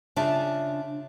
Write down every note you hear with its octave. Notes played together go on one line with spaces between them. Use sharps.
C#3 D4 F4 E5 A5